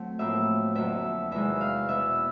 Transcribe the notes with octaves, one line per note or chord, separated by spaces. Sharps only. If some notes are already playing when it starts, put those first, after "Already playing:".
Already playing: F#3 A3 C4
A2 F3 A#3 E5
F2 D3 F#3 A#3 E5
E2 C3 D#3 G#3 E5
F5
B2 G#3 B3 E5